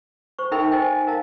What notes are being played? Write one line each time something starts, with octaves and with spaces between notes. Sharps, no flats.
C5 C#6
D#4 A4 A#4 E5 G5 B5
C5 D#5 G5 G#5
G#5
A#4 D#5 F5 A5